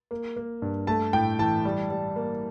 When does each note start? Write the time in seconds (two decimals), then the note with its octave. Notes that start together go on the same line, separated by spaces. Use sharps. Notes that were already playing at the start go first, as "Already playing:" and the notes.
0.11 A#3
0.36 A#3
0.62 G2
0.87 A3 A5
1.13 A2 G5
1.39 E3 A5
1.65 G3
1.90 G3
2.16 A#3